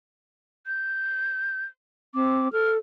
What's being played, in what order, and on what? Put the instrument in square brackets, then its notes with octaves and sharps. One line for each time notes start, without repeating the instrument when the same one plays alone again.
[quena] G6
[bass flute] C4 [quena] D6
[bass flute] A4 [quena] F6